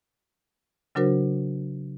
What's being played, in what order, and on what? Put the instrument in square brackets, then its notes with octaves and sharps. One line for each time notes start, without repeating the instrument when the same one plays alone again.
[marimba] C#3 F#3 D4 F#4 A#4 C5